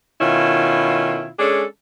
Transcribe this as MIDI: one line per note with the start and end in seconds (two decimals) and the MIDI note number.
0.21 1.28 47
0.21 1.28 51
0.21 1.28 61
0.21 1.28 64
0.21 1.28 65
1.39 1.64 56
1.39 1.64 61
1.39 1.64 62
1.39 1.64 68
1.39 1.64 69